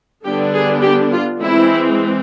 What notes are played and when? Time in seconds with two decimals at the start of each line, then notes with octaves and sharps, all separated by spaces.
0.25 D3 G3 B3 D4 G4
0.53 G#4
0.82 G4
1.12 F4
1.41 E3 G#3 C4 E4